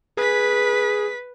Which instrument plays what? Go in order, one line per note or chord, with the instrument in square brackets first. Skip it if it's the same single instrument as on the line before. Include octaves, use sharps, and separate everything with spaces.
[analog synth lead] G#4 [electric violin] B4 B6